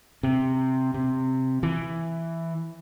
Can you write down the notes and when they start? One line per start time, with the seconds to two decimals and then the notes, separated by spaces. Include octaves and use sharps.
0.23 C3
0.94 C3
1.63 E3